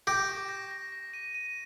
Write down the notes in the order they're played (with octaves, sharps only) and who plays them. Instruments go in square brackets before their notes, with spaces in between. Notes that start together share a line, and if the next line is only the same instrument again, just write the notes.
[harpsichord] G4 [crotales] A#6
[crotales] C#6
A#6
A#6
A#6
D#7
D#7